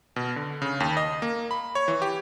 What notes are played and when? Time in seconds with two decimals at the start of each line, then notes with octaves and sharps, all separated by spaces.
0.16 B2
0.36 D3
0.62 C#3
0.80 D#2
0.97 D#5
1.22 A#3
1.51 B5
1.75 C#5
1.88 E3
2.02 G4